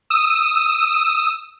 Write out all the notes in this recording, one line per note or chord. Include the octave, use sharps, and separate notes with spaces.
D#6 E6 D#7